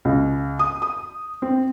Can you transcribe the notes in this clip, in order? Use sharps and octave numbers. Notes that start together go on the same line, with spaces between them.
C#2
D#6
D#6
C4